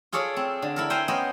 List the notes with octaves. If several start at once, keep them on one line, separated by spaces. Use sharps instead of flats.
F4 G#4 A4 C#5 D5
C4
D3
E4 A4 A#4
C5 E5 F5 G5 G#5 A#5
B3 C#4 C5 D#5